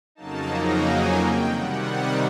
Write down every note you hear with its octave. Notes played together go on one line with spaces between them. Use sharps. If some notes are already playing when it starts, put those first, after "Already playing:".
F2 C#3 F#3 A#3 D#4 A5
A#5
G#5
G5
C3 D#3 G3 F#5
F#5